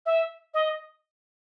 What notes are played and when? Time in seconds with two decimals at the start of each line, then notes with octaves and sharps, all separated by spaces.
0.06 E5
0.54 D#5